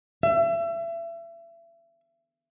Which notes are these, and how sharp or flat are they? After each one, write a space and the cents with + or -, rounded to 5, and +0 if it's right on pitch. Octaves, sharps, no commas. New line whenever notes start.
E5 +30